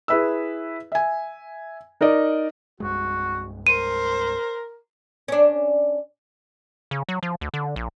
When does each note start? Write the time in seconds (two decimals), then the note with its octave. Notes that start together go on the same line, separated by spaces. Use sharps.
0.08 E4 G#4 B4 E5 E6
0.92 E5 G#5
2.01 D#4 A#4 D5 D#5
2.80 C2 G2 G#3 F#4
3.67 A#4 C5 D#7
5.28 C#4 D4
6.91 C#3
7.09 F#3
7.23 F3
7.41 D2
7.54 D3
7.76 A#1